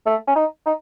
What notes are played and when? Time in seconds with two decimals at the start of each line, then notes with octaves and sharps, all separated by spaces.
0.06 A3
0.28 C#4
0.36 D#4
0.66 D#4